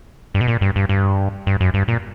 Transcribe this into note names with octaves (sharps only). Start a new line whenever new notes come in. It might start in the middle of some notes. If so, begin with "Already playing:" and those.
G2
B2
A#2
G2
G2
G2
G2
F#2
G2
A#2